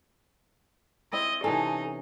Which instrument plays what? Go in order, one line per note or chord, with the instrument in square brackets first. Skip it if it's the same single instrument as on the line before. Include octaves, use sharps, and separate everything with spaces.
[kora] C4 E4 [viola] D#5
[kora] C3 E3 C#4 [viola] D#4 [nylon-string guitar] A4